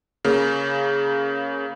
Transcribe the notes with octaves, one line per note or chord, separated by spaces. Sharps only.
C#3 A#3